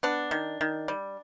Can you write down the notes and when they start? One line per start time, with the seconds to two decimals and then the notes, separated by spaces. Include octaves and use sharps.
0.03 B3 D4
0.31 D#3
0.61 D#3
0.88 G3